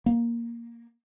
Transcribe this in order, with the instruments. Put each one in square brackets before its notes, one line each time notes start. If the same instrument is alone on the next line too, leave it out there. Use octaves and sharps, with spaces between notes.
[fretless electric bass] A#3